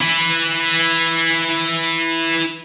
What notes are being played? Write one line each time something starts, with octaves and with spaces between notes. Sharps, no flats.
E4 B4